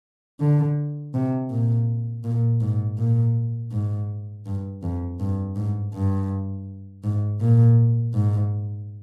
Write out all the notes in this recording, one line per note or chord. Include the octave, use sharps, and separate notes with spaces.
D3
C3
A#2
A#2
G#2
A#2
G#2
G2
F2
G2
G#2
G2
G#2
A#2
G#2